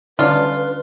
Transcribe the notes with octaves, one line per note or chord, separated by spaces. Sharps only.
D3 C#4 D4 F4 B4